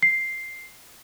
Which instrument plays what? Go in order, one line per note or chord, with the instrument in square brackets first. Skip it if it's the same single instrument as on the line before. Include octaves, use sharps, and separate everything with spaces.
[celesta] C7